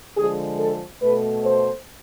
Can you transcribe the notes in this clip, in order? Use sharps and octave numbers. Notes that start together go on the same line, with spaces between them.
D3 F3 G#3 G#4
A4
B2 A3 B4
C5